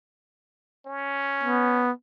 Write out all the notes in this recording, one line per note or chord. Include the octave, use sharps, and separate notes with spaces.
C#4
B3